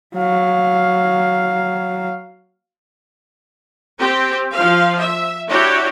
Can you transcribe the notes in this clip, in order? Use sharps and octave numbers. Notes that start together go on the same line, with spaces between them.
F#3 F5
C4 G4 G5
F3 F5
E5
D4 E4 F#4 G4 C#5